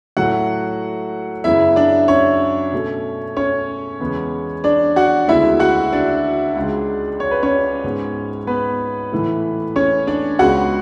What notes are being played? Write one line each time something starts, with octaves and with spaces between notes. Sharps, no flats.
A2 F#3 A3 F#4 F#5
F#2 C#3 F#3 B3 E4 E5
D4 D5
C#4 C#5
B2 A3
C#4 C#5
E2 C#3 G#3 B3
D4 D5
F#4 F#5
D2 C#3 G#3 B3 E4 E5
F#4 F#5
D4 D5
C#2 C#3 G#3
C#5
B4
C#4 C#5
G#2 G#3 B3
B3 B4
A2 E3 A3
C#4 C#5
D4 D5
C#2 C#3 G#3 B3 F#4 F#5